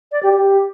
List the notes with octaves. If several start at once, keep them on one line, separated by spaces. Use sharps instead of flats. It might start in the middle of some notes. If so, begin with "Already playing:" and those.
D5
G4
G4